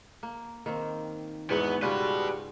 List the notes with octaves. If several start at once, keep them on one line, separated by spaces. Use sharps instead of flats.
A#3
D#3 A#3 C4
E2 G#2 B3 F#4 C#5
C#3 G3 F4 F#4 B4